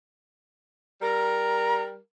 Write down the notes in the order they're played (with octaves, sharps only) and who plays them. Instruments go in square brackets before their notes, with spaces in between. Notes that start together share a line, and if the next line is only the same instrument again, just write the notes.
[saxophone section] G3 A#4 [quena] A#5